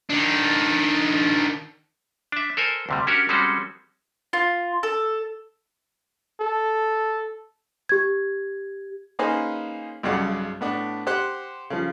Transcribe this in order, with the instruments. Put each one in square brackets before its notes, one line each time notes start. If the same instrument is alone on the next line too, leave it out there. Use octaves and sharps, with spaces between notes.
[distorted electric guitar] D#3 D4
[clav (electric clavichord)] D4 E5
A4 A#4 C5 G#5
D2 C3 G3
C#4 D4 F#4 G4 A#4 C#5
G3 G#3 C4 C#4 F#4 A4
[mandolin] F4
A4
[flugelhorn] A4
[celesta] G4 G#6
[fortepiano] A#3 C#4 D#4 G#4 B4 C5
B1 G2 C#3 D5 F#5
A2 B3 D4
G4 C5 F#5 C6 F#6
C#3 F3